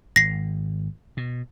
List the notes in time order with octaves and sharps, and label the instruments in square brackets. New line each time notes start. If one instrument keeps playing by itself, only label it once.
[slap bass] G#1 [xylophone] A#6 C7
[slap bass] B2